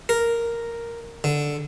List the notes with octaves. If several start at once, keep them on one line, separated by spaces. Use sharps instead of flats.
A#4
D3